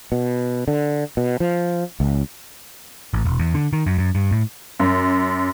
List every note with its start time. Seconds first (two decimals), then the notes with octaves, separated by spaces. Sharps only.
0.12 B2
0.68 D3
1.17 B2
1.40 F3
2.00 C#2
3.14 A1
3.25 E1
3.39 E2
3.54 D3
3.73 D#3
3.86 F#2
3.98 F#2
4.15 G2
4.31 A2
4.80 F#2